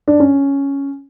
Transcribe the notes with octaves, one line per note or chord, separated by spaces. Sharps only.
D4
C#4